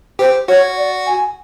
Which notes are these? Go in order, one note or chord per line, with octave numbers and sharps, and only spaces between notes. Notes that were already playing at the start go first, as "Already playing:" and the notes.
G4 C5
F#4 C#5
D5
G#5